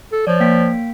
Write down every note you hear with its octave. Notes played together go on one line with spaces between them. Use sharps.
A4
F3 C#5 D5
A#3 G5 B6